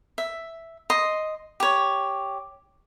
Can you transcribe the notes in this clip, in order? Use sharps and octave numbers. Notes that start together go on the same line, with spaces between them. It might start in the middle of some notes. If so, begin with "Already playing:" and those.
E5
D#5 C6
G4 C#5